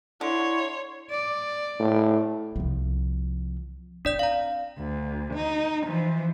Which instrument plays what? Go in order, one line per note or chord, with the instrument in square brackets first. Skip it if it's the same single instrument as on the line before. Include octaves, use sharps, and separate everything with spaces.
[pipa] D3 [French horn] E4 [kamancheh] C#5 [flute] C6
[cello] D5
[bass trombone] A2
[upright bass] C2 F3
[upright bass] C4 [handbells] D4 D5 G6
[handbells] F5 A#5
[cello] D2
D#4
E3 F3